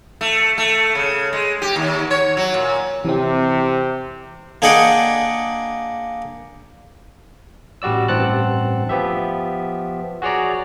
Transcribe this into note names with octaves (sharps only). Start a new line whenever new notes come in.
A3
A3
C#3
G#3
G4
D#2
C#5
F#3
A#2
C3 E3 C4
A#3 D4 G#4 D#5 F#5 G5
A1 G3 F#4 D5 E6
A1 G2 C4 F#5 A5 F#6
F3 B3 G4 E5
F#4 G#4 C#5 D5 A#5